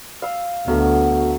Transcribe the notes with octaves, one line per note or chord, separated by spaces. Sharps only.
F5 E6
D2 F#3 B3 A4 E5